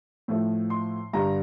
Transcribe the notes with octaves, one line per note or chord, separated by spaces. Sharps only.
A2 F3 A3
C6
G2 D3 G3 A#5